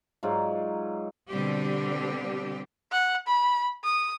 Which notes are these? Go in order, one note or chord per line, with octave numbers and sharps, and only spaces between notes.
G#2 F#3 F4 D5
B2 D3 G3 C4 G4
F#5
B5
D#6